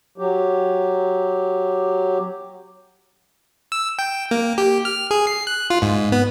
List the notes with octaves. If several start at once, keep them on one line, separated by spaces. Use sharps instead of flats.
F#3 G4
E6
G5
A#3
G4
F6
G#4
C7
F#6
F4
G#2
B3